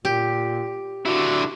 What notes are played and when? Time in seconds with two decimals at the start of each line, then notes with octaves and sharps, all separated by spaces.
0.05 A#2 G4
1.05 D3 E4 F#4